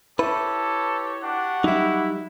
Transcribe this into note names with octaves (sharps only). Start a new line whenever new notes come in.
E4 G4 A4 B4 C#5
D4 F#4 G4 F#5
F#3 G3 D#4 E4 E5